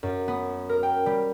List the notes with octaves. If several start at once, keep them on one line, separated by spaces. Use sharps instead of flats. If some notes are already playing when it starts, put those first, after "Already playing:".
F#2
B3
A#4
G5
G3